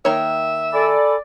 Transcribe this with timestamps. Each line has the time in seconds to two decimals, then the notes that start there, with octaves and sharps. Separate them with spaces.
0.05 D#3 A#3 C#5 E5
0.73 A4 D5 G#5 B5